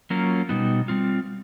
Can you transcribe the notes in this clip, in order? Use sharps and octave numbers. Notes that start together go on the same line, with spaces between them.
F#3 A#3 C#4 F4 A#4
B2 G3 B3 D#4 F#4
G3 C4 F4